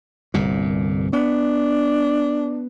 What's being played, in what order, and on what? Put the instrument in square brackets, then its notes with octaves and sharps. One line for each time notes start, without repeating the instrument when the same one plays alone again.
[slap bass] G1 C2 A#2
[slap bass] B3 [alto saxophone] D4